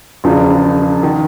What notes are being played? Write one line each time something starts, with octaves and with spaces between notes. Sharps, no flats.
E1 E2 C#3 F3
D#3